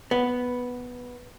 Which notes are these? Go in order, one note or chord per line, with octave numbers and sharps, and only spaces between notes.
B3